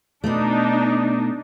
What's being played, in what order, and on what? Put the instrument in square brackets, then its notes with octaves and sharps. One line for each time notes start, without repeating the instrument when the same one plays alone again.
[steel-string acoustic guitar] B2 A3 [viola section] D4 D#4